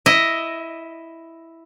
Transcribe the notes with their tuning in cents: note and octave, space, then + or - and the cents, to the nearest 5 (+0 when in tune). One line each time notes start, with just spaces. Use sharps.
E4 +0 D#5 +5